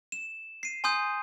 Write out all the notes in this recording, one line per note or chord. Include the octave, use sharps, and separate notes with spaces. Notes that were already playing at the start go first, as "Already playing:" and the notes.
E7
C7 D#7
G#5 C6 D#6 G6